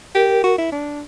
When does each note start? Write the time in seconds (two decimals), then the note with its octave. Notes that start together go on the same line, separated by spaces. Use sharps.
0.15 G4 A#4
0.44 F#4
0.58 E4
0.72 D4